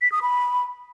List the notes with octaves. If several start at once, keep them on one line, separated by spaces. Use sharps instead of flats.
B6
D#6
B5